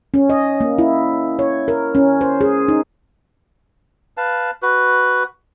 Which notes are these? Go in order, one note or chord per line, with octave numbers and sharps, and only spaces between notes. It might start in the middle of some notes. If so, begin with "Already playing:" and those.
C#4
D#5
A#3
E4
C#5
A#4
C#4
C5
G#4
D#4
B4 F5 A5
F#4 B4